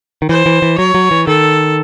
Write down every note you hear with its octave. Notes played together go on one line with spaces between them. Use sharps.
D#3
E3 C5
E3
E3
F#3 C#5
F#3
E3
D#3 A4